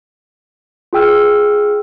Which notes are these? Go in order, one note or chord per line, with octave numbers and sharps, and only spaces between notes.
F4 G#4 G5 E6 F6